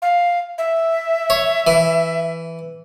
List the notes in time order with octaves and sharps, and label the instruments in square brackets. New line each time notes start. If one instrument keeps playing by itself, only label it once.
[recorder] F5
E5
[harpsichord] C#5
E3